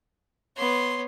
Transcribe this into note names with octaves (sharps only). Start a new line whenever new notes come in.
B3 C#5 C6